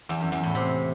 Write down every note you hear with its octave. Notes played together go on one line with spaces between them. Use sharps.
E2
F#2
E2
A2
C3